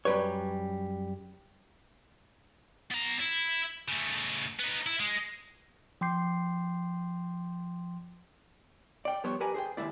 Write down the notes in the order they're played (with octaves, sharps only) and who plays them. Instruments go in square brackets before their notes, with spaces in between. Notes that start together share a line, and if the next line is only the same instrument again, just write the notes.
[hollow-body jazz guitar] F#2 G3 B4 C#5
[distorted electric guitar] B3 A#5
E4
C#3 A3
B3 D#4
E4
G#3
[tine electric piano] F3 G5 C6 D6 G6 C7
[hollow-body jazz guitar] D5 G5
F3 G3 B3 C5 C#5
G4 A#4 B4 D5 G#5 A#5
G#4 C5 G5
D#2 B2 G#3 E4 D5